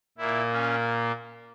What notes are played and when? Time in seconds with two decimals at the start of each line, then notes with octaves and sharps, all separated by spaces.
0.18 A#2 A#3 E4
0.52 C#4